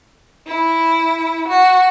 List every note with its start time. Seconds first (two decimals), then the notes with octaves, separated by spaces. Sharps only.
0.47 E4
1.48 F#4